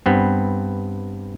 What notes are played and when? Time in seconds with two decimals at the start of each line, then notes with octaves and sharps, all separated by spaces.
0.06 G2 B3 C4